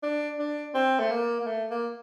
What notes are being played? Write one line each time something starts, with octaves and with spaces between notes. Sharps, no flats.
D4
D4
C4
A3
A#3
A#3
A3
A#3